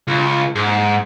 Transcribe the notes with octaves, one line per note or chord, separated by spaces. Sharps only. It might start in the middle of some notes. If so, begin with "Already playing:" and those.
C#2
G#2